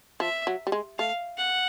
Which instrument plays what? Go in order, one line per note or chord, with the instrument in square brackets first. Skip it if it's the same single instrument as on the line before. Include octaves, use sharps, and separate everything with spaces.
[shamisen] F3 [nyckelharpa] E5
[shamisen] F#3
G3
G#3
[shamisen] A3 [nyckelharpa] F5
[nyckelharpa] F#5